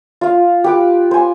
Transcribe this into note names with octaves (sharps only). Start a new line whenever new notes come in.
F4 F5
G4 B4 D6
C5 G#5